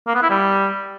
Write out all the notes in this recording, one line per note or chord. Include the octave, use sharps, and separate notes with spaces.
A#3
B3
E4
G3